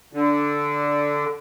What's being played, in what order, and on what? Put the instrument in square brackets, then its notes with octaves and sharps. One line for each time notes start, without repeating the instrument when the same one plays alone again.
[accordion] D3